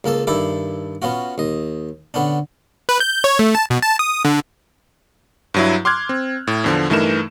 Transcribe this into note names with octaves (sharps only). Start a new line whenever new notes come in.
C#2 A#3 A4 A5
G2 D#3 E4 A4 D6
B3 C#4 F4 F#4
D#2 D#5
D3 B3 C#4 D4
B4
G6
C#5
A3
A5
B2
A5
D#6
D3
G2 F#3 E4
C6 D6 F6 F#6 G#6
C4
A2
E2 D3 F3
G2 E3 A3 D#4 A#4 E7